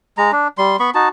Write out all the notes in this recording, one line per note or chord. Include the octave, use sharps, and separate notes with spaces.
G#3 A#5
D4
G3 C6
B3 B5 C#6
D#4 F#4 A5